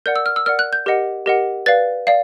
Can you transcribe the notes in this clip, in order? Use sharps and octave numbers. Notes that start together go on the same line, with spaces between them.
A#4 D5 F#5 G6
E6
F6
E6
A#4 D5 F#5 F6
F#6
G6
G4 A#4 D#5 F#5
G4 A#4 D#5 F#5
B4 D5 F5 A6
D5 F5